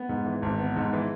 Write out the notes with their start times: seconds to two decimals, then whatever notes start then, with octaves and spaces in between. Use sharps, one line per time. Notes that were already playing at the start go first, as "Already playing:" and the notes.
Already playing: B3
0.09 G#2
0.26 E3
0.42 G#1
0.59 B3
0.76 G#2
0.93 E3